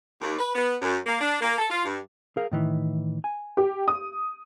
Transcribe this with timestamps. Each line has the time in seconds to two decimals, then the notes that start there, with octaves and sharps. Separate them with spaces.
0.21 D#2
0.39 B4
0.54 B3
0.81 F#2
1.06 A#3
1.20 D4
1.41 A#3
1.58 A4
1.70 F4
1.85 G2
2.37 G#4 A#4 F5
2.52 A2 D#3 E3
3.24 G#5
3.57 G4
3.88 D#6